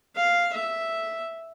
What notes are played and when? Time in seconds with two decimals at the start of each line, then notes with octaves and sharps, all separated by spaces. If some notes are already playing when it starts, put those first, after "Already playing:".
0.16 F5
0.54 E5